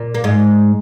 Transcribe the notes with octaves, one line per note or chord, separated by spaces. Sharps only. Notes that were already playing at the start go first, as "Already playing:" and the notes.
Already playing: A#2
A#3
G#2 G#3